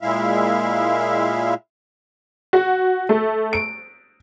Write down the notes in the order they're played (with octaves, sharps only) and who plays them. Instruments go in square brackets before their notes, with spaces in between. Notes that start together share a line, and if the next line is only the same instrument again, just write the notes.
[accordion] A#2 G#3 E4 E5 F5
[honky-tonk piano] F#4
A3
D7